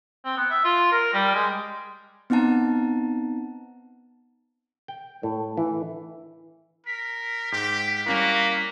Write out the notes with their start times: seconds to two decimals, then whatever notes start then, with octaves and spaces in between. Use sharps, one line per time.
0.25 C4
0.37 B3
0.50 E5
0.64 F4
0.92 A#4
1.13 G3
1.34 G#3
2.30 B3 C4 D#4 F#5 A5 A#5
4.88 G5
5.23 A2
5.57 E3
6.86 A#4 B6
7.52 G#2 G4
8.06 G3 A#3 C#4 E4 F#4